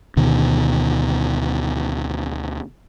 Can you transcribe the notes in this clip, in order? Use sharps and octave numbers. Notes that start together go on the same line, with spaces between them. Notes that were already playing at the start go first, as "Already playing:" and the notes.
D2 B2 D#3